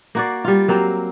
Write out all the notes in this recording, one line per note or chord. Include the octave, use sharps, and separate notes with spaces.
A#3 F#4 D5
G3 F4
F#3 A#3 C4